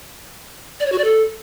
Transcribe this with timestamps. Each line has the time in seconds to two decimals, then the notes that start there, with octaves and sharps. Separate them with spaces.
0.80 D5
0.86 C#5
0.92 F#4
0.98 D5
1.04 A4